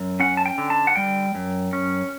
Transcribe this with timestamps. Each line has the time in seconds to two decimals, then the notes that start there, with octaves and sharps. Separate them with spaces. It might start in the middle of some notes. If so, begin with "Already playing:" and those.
Already playing: F#2
0.20 C#4 F#5
0.37 A5
0.46 G5
0.58 D3
0.70 A5
0.87 F#5
0.96 G3 G5
1.35 F#2
1.73 C#4